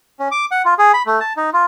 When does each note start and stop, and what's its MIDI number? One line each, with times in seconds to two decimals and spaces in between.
0.20 0.28 61
0.31 0.45 86
0.51 0.62 78
0.65 0.74 65
0.79 0.92 68
0.94 1.02 83
1.06 1.20 57
1.20 1.33 81
1.37 1.50 63
1.54 1.66 65